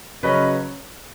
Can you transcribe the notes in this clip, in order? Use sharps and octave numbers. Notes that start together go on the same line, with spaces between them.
C#3 F#3 C#4 B4 D#5